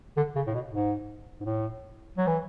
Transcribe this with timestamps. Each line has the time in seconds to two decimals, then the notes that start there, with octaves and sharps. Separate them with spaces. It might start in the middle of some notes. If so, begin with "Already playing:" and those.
0.17 D3
0.36 C#3
0.47 A2
0.54 B2
0.72 G#2
1.40 G#2
1.45 A2
2.17 F#3
2.27 E3